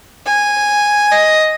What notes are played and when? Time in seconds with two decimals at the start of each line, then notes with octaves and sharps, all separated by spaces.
0.26 G#5
1.12 D#5